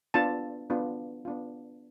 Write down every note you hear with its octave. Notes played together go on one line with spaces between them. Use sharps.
B3 D4 F4 A5
B3 D4 F4
B3 D4 F4